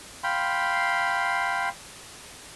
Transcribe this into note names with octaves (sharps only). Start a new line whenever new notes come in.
F5 G5 B5 C6